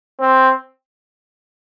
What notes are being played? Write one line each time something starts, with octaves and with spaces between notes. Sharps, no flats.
C4